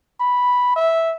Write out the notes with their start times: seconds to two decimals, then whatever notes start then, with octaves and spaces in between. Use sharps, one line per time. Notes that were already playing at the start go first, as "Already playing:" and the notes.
0.20 B5
0.76 E5